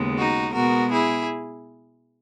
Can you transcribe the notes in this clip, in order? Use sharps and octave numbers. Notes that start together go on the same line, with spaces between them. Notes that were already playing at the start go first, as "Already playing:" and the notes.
Already playing: D#2 C#3 G#3 B3
D#4 F#4
B2 G#3 B3 F#4 A#4
E4 G#4